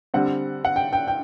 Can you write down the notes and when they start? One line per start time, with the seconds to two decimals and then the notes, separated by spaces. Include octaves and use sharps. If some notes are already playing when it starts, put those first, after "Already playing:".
0.14 D3 G3 C4 F#5
0.65 F#5
0.76 G5
0.93 G5
1.07 G5